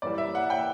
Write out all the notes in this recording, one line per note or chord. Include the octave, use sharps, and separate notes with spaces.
F#2 E3 G3 D5
E5
F#5
G5